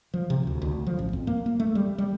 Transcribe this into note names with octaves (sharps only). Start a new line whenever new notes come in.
F3
C3
D2
D2
F3
A1
F2
A#3
A#3
A3
G3
G3